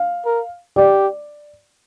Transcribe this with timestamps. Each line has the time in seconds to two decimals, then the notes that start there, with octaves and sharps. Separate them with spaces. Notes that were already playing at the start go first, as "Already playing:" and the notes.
Already playing: F5
0.26 A#4
0.76 G4 D5